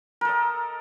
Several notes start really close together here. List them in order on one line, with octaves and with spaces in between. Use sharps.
A#4 A4 D#5